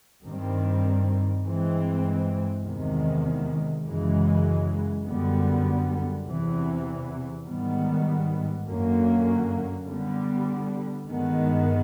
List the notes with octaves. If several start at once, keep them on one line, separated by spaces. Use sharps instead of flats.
G2 D#3 G3 C4
G2 E3 G#3 C4
E2 C3 D#3 G#3
F#2 C#3 E3 G#3
F#2 D3 G3 B3
E2 C3 E3
G#2 D#3 G3 B3
F#2 D3 F#3 A#3 C#4
D3 G3 B3
G2 D#3 G#3 B3